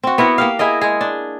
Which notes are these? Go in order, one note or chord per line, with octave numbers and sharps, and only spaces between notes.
C4 F#4
B3 E4 A#4 F#5
A#3 G4 F5
E4 G#4 A#4 D#5
G#3 G#4
D4